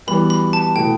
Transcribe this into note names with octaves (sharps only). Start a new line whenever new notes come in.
E3 G3 B3 F#4 B5
B5
A5
B2 A3 E4 G5